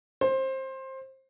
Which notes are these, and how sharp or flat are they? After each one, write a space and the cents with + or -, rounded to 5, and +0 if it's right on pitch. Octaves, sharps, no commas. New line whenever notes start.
C5 +20